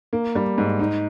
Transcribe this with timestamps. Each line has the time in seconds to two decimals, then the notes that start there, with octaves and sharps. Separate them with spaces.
0.13 A#3
0.35 G3
0.58 G#2
0.79 D#4